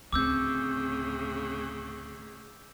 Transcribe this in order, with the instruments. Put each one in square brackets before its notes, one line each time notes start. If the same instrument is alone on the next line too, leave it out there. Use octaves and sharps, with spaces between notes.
[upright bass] D2 C4 [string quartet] A2 C#3 [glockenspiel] D6 E6 G6